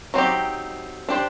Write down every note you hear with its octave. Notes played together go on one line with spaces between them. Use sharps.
F#3 C4 D#4 G4
D4 G4 C5